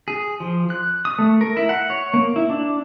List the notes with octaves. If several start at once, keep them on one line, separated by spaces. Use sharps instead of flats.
G#4
F3
F#6
D#6
A3
A#4
E4
F#5
C#5
A#3
E4
D4